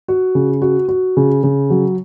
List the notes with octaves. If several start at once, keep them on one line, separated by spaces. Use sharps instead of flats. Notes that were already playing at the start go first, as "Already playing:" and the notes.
F#4
C#3
F#4
F#4
C#3
C#3
F#3